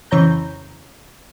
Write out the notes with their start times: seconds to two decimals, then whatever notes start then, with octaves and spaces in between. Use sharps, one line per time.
0.11 F2 C#3 E3 C#5 A#5 G6